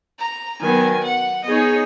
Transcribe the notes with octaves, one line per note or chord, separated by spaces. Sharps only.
A#5
D#3 F#3 B3 G#5
F#5
B3 D#4 G#4 C#5 D#5